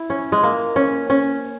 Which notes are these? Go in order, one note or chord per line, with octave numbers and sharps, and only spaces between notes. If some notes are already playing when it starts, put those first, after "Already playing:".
Already playing: E4
C#4
G#3
A#3
C#4
C#4